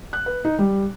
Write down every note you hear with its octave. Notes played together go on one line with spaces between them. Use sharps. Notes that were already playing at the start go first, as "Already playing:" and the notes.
F#6
B4
D#4
G3